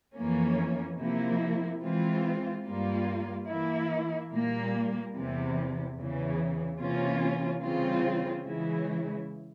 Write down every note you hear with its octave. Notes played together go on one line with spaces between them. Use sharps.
F2 E3 A#3 C#4
C3 F3 A#3 E4
E3 G#3 C4 F4
G2 G3 A#3 F4
E3 A#3 E4
A#2 G3 A#3
E2 C3 E3
E2 C#3 E3
C3 E3 A#3 C#4 F4
C#3 E3 G3 C4 F4
C#3 E3 G#3 E4